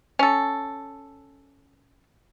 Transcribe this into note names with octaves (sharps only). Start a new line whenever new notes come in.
C#4 A4